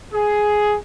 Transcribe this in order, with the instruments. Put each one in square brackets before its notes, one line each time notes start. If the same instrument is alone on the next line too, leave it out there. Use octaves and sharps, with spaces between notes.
[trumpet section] G#4